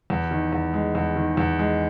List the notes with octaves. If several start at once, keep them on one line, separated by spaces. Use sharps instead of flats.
E2
D#3
E2
G#3
E2
D#3
E2
G#3